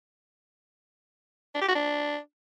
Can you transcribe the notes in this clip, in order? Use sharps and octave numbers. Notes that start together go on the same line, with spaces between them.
D4
G4
F#4
D4